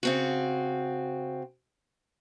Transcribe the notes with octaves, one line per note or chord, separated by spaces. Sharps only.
C#3 C4 F#4